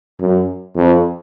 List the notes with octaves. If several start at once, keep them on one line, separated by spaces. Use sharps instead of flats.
F#2
F2